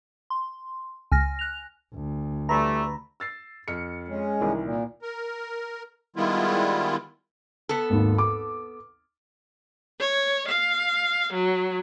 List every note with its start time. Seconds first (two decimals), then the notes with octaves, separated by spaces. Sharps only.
0.30 C6
1.11 C#2 G#5 F6 A#6
1.39 F#6 F7
1.94 D2
2.49 E3 G3 A3 A#5 B5
3.20 E6 A6 C7
3.68 F2 F6 C#7
4.08 G#3 C#4
4.40 C2 D#3 E3
4.62 A#2
5.02 A#4
6.16 D#3 G3 G#3 B3 E4 F4
7.69 B3 A4
7.90 G#1 D#2
8.18 D6
9.99 C#5
10.48 F5
11.32 F#3